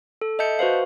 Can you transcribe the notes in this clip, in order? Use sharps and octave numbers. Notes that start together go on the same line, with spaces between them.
A4
D#5 E5 A5 G6 C#7
F#4 B4 C5 F5